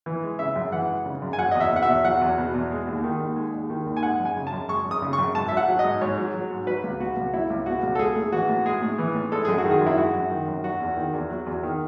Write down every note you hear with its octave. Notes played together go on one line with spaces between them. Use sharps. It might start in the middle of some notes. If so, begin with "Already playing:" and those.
E3
G#3
C#3 E5
F#2
E3 F#5
G#3
C#3
F#2
G#5
F#3 F#5
E2 D#5
E5
B2 F#5
E5
E2
F#3 F#5
E2
B2
E2
G#3
D#2
D#3
D#2
G#3
D#2
D#3
D#2
G#5
G#3 F#5
F#2
G#5
C#3
A5
F#2
G#3 C#6
F#2
D#6
C#3
C#6
F#2
G#2 A5
F#3 E5
F#5
F#3
D#5
G#2
G#2 C#5
F#3
F#3
G#2
F#3 B4
C#2
B2 F#4
C#2
F#3 E4
C#2
B2 F#4
C#2
A4
G#3 G#4
A2
E3 F#4
A2
G#3 G#4
A2
E3
A2
G#3 A4
F#2 G#4
F#4
D#3
G#4
F#2
E4
G#3 F#4
F#2
D#3
F#2
F#3 F#4
E2
D#3
E2
F#3
E2
D#3